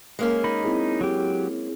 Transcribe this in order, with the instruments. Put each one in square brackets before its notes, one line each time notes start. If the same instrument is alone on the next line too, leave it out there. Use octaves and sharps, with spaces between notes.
[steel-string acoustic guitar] G#3 A#3 C#4
[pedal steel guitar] D#4 B5
[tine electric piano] C4 E4 G#4
[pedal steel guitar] F#3 G4